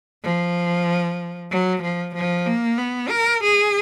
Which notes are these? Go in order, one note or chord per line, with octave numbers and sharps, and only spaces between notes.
F3
F#3
F3
F3
A#3
B3
A#4
G#4